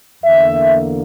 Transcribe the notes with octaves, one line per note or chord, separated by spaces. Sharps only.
E2 D3 A#3 E5